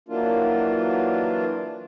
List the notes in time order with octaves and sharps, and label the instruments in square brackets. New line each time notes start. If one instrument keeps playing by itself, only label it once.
[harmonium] E3 F#3 A#3 D4 F4